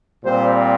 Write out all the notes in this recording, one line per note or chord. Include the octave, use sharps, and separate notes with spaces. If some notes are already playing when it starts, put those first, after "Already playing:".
A#2 G3 C4 C5